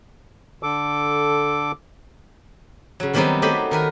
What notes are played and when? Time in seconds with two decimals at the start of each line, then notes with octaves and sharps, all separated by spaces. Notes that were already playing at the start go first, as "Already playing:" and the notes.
0.63 D3 A4 D6
3.00 C#3 F#3
3.14 D#3 F#3 G3 B3 C4 D#4
3.42 F#3 A3 G4 C5 D#5 B5
3.71 D#3 A#4 B4